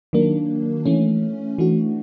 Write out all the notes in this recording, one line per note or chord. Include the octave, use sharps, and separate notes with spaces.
D#3 F#3 A#3 D4
E3 A3 C#4
E3 A3 D4 F#4